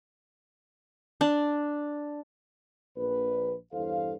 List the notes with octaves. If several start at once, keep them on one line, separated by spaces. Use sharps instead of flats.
D4
A#1 B4
E2 G2 E4 A4 C5 F5